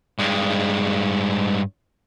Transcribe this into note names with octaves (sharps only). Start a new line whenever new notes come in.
G2 G#3